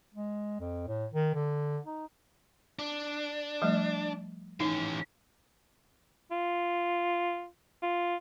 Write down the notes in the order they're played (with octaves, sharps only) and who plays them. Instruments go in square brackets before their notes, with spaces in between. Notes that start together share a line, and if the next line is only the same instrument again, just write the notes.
[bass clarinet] G#3
F2
A2
D#3
D3
D#4
[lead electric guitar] D4
[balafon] F3 G3 A3
[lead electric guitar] E3 C#4 [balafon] D#4
[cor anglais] F4
F4